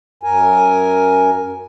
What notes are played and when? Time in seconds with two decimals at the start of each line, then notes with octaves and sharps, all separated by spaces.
0.23 F#2 A#4 G#5